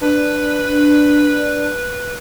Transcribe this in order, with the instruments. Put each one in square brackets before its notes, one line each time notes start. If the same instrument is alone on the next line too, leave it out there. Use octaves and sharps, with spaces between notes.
[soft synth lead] D4 [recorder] B4